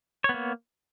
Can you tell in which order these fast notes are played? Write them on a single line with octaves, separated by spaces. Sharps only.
C#5 B3 A#3